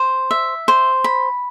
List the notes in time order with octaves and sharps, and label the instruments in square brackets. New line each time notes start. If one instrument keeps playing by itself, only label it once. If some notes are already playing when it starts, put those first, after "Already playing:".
Already playing: [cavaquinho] C5
E5
C5
B5